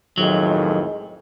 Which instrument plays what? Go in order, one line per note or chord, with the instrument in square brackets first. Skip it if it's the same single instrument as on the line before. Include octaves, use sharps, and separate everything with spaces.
[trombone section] B1 F2 A2 [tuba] D#3 [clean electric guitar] F#3 [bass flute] G#3